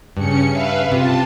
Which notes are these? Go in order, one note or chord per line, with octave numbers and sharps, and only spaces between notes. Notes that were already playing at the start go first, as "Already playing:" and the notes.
G2 C#3 C#4 C#7
B4 E5 F5
C3 F4 A5